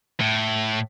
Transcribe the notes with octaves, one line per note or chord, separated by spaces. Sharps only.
A2